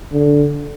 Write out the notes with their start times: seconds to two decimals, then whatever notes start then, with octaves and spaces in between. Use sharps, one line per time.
0.12 D3